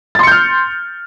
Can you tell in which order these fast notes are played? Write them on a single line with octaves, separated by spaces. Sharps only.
A6 C6 C#7 G6 F6